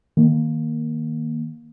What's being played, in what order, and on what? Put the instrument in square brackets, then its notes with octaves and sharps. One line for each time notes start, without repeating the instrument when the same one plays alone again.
[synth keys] D#3 A#3